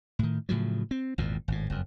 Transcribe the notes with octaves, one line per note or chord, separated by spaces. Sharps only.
A2 D#3
A2 C#3 F3 F#3
C4
G#1 E2 A#2
G#1 A2
F#1 F2